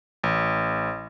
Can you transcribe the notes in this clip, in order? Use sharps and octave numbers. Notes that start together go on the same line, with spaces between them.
A1